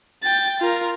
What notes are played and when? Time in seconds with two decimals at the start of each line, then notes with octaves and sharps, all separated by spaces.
0.23 G5 A6
0.60 F4 A#4